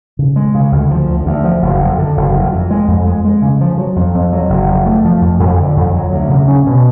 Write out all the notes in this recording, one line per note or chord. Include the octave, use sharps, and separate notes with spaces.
C#3
G#3
C#3
D2
F3
D2
D2
F3
F#1
F2
D3
F#1
F2
F2
G#3
F2
G#3
G#3
C#3
F3
F#3
F2
F2
F#3
F#1
F2
A3
F3
F2
F2
D3
F2
F#3
D2
C#3
C#4
B2